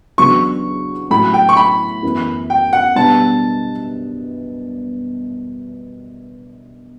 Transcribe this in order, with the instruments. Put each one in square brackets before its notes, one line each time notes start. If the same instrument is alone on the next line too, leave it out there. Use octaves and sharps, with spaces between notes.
[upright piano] E2 C#3 F#3 B3 D4 [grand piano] C#6
[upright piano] A2 F#3 C#4 [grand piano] B5
[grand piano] G5
C#6
B5
[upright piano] F#2 E3 B3
[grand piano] G5
F#5
[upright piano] B2 G3 B3 D4 [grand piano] A5